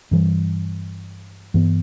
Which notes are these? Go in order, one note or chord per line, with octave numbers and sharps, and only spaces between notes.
G2 E3 G3
G2 E3 B3